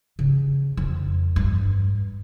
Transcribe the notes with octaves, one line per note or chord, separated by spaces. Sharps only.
C#3
F2
G2